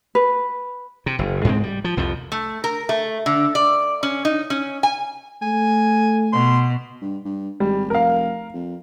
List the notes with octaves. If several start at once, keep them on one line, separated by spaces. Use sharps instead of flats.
B4
C3
F#1
G#2 G#3 B3 C4
G3
F3
C2 F2 F3
A3
A#4
A3
D3
D5
C#4
D#4
C#4
G#5
A3 G#5
B2 C6
G2
G2
G#1 G3
F1 A#4 F5
F2